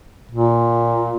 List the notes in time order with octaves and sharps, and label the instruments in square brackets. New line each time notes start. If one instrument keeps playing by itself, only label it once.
[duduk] A#2